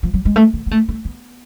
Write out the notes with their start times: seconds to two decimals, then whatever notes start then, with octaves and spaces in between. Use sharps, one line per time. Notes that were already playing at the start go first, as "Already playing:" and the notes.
0.03 F3
0.14 F#3
0.25 G#3
0.36 A3
0.53 D3
0.66 B3
0.71 A3
0.88 A3
1.05 B3